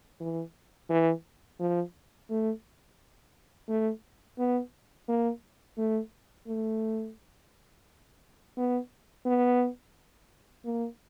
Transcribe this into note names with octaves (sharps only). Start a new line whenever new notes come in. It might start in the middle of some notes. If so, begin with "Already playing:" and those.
E3
E3
F3
A3
A3
B3
A#3
A3
A3
B3
B3
A#3